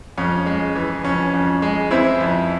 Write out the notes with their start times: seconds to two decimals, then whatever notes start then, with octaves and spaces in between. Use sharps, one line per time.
0.17 F2 C#4
0.46 G#3
0.75 E3
1.04 F2 C#4
1.34 F2
1.62 G#3
1.91 E3 C4 E4
2.20 F2